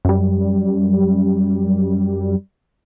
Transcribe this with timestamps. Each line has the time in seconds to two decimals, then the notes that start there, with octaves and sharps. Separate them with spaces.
0.05 F#2 G3